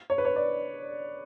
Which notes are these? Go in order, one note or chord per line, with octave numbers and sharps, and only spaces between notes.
C#5
B4
C#5
D5